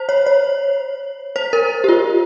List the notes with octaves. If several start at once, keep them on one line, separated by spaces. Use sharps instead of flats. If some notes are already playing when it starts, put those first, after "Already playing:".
Already playing: C5
C#5
C#5
C5
A#4
G4
F4